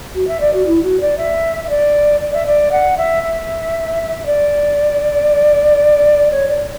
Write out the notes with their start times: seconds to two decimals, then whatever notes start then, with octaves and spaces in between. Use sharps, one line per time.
0.15 F#4
0.27 E5
0.40 D5
0.53 F#4
0.66 E4
0.83 F#4
1.00 D5
1.17 E5
1.64 E5
1.69 D5
2.20 D5
2.33 E5
2.46 D5
2.71 F#5
2.97 E5
3.23 E5
4.25 D5
6.31 C#5
6.48 D5